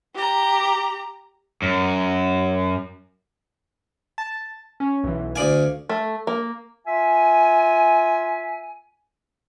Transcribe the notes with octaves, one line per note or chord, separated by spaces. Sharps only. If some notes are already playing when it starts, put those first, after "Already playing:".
G4 A#5
F#2
A5
C#4
B1 E3
D2 D5 F5 G#5
A3
A#3
F4 E5 G#5